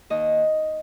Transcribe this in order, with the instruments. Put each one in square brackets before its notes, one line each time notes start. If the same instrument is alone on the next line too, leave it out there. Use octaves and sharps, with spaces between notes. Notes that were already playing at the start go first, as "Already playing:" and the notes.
[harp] D#2 D#5